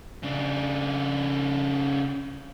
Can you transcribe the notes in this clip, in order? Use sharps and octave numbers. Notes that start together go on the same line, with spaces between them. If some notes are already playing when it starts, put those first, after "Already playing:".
C#3 D4